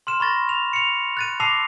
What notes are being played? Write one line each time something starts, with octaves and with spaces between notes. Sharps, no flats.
C6 F6 E7
B5 C#6 A6 A#6
F7
C#7 F7
F#6 A6 D#7
A5 D6 E6 A#6 C7 F7